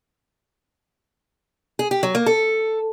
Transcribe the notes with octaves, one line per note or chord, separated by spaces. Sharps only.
G#4
G4
F#3
A#3
A4